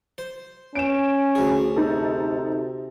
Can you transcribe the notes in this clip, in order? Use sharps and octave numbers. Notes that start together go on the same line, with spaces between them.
C5
C#4 D7 E7
D2 G#4
C3 D#4 A4